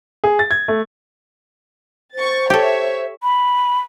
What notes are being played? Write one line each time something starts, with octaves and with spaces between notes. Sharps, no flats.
G#4
A6
G#6
A3
C5 C#6 A6
G4 A4 C#5 E5
B5